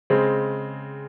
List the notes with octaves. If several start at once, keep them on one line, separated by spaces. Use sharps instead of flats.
C#3 G#3 C4